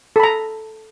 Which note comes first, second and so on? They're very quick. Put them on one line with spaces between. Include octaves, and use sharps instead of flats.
A4 B5 A#5